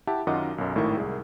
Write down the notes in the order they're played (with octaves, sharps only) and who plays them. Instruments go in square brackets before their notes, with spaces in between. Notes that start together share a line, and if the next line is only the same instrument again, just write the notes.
[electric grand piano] E4 G4 E5 F#5 A5
F#2 D#3 F4 D#5 F#5 D6
B1 F#2
G#1 A2 D#3 E4 A#4 C#6
C2 G#4